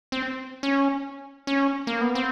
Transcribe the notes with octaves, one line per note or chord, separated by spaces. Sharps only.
C4
C#4
C#4
A#3
B3
C4